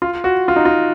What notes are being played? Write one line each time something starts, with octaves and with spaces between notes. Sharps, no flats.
F4
F#4
F4
D#4
F4